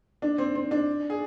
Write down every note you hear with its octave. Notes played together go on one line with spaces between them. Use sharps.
D4
C4
C4
D4
G#4